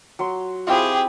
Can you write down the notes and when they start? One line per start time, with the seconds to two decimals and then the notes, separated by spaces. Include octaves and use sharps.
0.19 F#3 C6
0.67 C4 E4 F4 G4 G#4